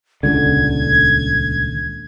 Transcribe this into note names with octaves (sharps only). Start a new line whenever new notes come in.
D#1 C#2 D3 G#6